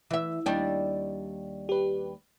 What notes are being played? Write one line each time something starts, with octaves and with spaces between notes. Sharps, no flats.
E3 E5
D#2 G3 D4
G4 B4